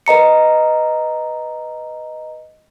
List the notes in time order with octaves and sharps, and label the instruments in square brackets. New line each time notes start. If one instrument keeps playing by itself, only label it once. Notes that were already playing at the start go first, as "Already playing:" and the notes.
[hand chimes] B4 D#5 A#5 C#7